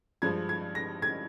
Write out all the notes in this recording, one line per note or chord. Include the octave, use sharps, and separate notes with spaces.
G2 F3 G#3 G#6
G#6
A#6
G#6